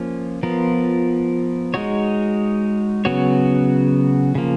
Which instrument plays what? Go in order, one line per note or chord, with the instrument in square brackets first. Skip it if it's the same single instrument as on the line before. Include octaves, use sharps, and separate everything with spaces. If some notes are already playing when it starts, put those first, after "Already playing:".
Already playing: [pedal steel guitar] F3 A#3 C#4 F4
F3 B3 F4 A#4
G#3 D#4 F#4 C#5
C#3 F#3 B3 F#4 C#5
C#3 F3 A#3